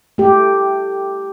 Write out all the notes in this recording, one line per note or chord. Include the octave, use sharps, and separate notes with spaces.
A3 G4